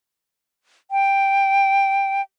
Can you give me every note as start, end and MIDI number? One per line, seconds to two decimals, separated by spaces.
0.91 2.21 79